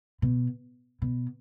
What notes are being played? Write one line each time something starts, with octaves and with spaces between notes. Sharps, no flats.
B2
B2